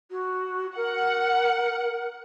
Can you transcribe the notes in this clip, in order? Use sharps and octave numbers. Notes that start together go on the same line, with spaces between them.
F#4
A#4 F#5